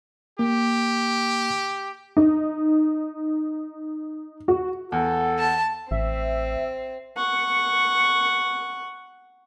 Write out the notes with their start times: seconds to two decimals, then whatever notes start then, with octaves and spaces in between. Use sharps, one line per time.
0.39 A#3 G4
2.17 D#4
4.48 F#4
4.92 E2 A4 F#5
5.39 A5
5.91 A1 C4 E5
7.17 F#5 C#6